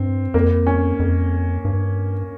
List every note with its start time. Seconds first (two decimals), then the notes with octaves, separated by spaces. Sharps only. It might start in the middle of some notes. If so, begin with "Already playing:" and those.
Already playing: G2 C4
0.34 F2 A#3
0.67 C#4
1.00 F2
1.65 G2